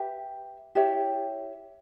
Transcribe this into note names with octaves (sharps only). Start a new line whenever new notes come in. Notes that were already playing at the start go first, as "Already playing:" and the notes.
Already playing: G4 B4 E5
E4 G4 C#5 E5